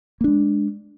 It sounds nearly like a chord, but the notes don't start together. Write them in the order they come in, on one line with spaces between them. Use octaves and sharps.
A#3 D4 G#3